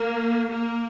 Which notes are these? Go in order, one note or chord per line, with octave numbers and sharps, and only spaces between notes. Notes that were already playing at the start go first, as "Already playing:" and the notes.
Already playing: A#3
A#3